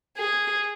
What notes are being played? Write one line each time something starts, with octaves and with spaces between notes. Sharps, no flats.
G#4